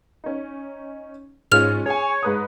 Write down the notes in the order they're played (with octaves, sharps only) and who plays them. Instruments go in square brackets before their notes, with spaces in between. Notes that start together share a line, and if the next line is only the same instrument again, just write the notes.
[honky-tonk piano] C#4 D#4
[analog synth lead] G#2 [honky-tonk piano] G#3 C#4 F4 [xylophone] F6 F7
[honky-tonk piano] G#4 G#5 [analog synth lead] C#5
[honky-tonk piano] G#2 B4 D#6